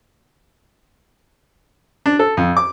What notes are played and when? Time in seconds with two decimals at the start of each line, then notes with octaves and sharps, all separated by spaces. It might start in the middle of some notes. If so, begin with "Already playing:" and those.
2.06 D4
2.19 A4
2.37 F2
2.57 D6